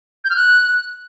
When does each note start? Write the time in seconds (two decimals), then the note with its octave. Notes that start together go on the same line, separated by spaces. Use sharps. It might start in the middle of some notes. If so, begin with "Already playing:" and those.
0.24 G6
0.30 F6
0.36 F#6